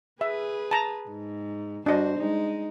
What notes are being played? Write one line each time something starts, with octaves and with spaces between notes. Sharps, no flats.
G#4 B4 E5
A5 A#5
G#2
G2 D4 F#4 C5 D#5
G#3 D#4